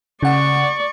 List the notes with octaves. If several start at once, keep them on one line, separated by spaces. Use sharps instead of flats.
C#3 D5 F#5 C#6